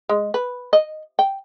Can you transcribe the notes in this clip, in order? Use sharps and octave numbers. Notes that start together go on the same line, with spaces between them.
G#3
B4
D#5
G5